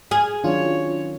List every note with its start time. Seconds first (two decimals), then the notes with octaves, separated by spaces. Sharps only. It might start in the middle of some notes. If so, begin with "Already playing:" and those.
0.11 G#4 F6
0.44 D#3 F#3 C#4 D4 F4 C#5